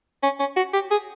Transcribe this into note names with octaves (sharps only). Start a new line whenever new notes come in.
C#4
C#4
F#4
G4
G#4